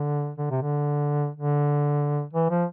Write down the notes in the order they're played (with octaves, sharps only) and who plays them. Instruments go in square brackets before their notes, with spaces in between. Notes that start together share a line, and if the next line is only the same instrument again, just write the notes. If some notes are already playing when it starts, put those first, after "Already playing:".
Already playing: [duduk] D3
D3
C3
D3
D3
E3
F3